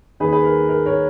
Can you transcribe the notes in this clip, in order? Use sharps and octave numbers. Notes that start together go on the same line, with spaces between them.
D#2 D#3 G#4 B4
G#4 B4
A#4
A#4
A#4 C#5